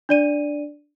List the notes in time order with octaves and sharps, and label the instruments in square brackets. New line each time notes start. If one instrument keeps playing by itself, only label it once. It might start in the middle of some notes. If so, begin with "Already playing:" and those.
[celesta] D4 D5 D#7